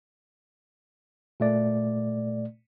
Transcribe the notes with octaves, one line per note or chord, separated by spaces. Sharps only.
A#2 A3 D5